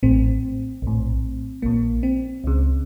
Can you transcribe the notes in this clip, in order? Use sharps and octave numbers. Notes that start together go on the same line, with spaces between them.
A1 A2 C4
A#1 A2
A#1 A#2 A#3
C4
C#2 C#3